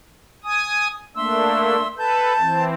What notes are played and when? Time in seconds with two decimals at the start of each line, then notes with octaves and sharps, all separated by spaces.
0.44 G#5 D#6
1.16 A3 A#3 D4 E5 C6 E6
1.97 A4 B4 A5 G6
2.39 E3 C4